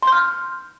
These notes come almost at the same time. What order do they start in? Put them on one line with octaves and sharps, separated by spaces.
C6 G6 F6